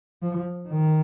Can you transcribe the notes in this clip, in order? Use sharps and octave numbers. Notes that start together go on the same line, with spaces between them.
F3
D#3